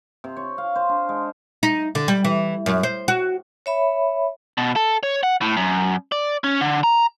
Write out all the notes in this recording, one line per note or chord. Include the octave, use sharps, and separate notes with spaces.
C3
C#5
F5
C5
D4
G#3
D#4
D3
G3
E3
F#2
C5
F#4
C#5 E5 B5
B2
A4
C#5
F#5
A2
F#2
D5
C#4
D3
A#5